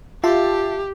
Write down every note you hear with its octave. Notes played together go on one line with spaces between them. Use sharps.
F4 G4 E5 A5